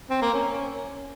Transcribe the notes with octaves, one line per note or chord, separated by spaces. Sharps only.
C4
A#3
C#4